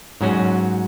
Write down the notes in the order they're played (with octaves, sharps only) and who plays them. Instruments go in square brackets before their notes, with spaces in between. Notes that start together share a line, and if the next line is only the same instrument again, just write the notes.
[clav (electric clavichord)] G#2 F#3 C#4 F#4